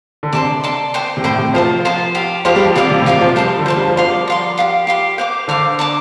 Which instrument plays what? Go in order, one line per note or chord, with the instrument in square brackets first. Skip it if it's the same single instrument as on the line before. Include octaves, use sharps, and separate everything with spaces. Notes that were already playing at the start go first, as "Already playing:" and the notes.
[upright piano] D3
[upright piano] C3 [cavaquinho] D5 A5 C6
[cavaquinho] D5 A5 C6
C5 G5 C6
[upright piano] C3
[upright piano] A2 [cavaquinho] C5 G5 C6
[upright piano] C3
[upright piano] F3 [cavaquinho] F4 C5 A5
[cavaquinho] F4 C5 A5
G4 F5 C6
[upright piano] F3 [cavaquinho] G4 F5 C6
[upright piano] G3
F3
[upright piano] C3 [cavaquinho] F4 D5 F5 D6
[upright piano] C3
A2
[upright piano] C3 [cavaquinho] F4 D5 F5 D6
[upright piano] F3
[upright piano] G3 [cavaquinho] C5 A5 C6
[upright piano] D3
[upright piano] F3 [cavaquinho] C5 A5 C6
[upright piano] G3
F3
[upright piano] F3 [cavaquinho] D5 F5 C6
[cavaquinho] D5 F5 C6
G4 F5 C6
G4 F5 C6
C5 F5 D6
[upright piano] D3 [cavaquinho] C5 F5 D6
[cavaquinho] D5 A5 D6